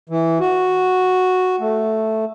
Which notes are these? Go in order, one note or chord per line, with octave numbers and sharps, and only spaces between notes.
E3
F#4
A3